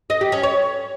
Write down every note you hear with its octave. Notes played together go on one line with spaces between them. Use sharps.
D#5
G4
C#4
C#5